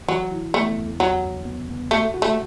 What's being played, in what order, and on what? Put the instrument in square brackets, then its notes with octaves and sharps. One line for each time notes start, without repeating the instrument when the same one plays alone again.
[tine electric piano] E3 [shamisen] F#3
[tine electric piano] E4
[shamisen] A3 [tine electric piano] B3
[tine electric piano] E2
[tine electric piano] E2 [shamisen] F#3
[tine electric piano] E2
B3
B3
[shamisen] A3 [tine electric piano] F#4
[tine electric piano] F#4
[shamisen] A3